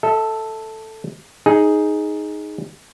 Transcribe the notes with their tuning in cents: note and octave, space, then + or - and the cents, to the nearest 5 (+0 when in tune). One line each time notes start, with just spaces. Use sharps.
A4 +0 E5 -35
D#4 +0 G#4 +0